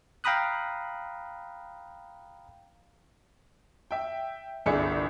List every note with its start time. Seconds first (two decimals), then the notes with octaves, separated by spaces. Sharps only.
0.24 F5 G5 A#5 B5 D#6 F#6
3.91 E5 G5
4.66 G1 C2 G#4 D5 E5 C#7